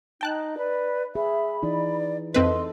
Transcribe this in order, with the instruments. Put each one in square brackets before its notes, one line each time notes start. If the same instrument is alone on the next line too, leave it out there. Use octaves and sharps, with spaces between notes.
[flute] D#4 [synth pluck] G5 A5 F#6
[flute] B4 [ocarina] D5
[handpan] G#4 [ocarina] E5 [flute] B5
[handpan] E3 D#4 E4 [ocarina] D5
[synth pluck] F2 C4 B4 [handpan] D#4 A4 [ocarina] D#5 [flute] C6